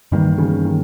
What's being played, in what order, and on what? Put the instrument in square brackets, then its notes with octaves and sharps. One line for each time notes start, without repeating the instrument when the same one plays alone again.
[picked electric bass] G2 E3 G3 A#3 [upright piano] D#3
[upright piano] C#3
D#3